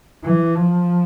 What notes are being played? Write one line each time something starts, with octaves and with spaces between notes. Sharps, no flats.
E3
F3